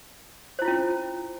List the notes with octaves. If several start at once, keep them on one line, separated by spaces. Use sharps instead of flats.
C#4 E4 F4 C5